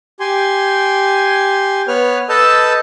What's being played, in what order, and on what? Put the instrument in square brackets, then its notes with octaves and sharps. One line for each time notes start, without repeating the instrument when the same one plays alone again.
[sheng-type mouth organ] G4 G#5 C6
B3 B4 C#5 F6
A4 B4 D#5 A5 E6 G6